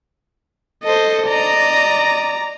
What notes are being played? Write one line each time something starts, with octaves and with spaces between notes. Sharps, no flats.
A4 C5 D#5
D5 D#5 A#5